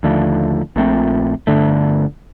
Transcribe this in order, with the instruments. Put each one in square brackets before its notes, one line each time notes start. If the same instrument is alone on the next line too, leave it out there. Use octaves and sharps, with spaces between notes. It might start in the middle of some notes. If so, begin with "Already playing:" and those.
[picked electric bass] D#2 D3 F3 A3
A#1 A#2 A3 C4
G1 F2 D3 A3